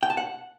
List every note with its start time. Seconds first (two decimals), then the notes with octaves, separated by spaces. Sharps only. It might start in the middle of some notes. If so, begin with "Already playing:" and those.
0.03 G5
0.10 A5
0.17 F#5